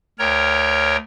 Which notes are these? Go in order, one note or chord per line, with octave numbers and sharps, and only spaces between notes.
D2 A#4 C#5 G5 A#5